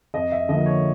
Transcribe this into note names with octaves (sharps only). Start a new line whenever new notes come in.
F2 D#5
E5
D3 F3 A#3 D#5
C#5